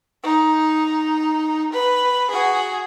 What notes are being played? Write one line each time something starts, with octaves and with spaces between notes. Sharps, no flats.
D#4
B4
F#4 G#4